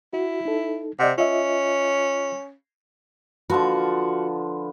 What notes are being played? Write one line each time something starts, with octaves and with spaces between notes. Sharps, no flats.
E4 F#4
D#4 A4
C3 D5 D#5 F#5
C#4 F4 D#5 E5
D3 F3 F#4 B4